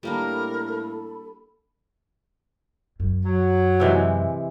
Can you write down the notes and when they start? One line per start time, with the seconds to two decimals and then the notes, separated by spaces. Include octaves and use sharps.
0.03 A2 G3 A#3 D4 A4 A#4 B5
3.00 F#2
3.25 F#3
3.80 C3 E3 G#3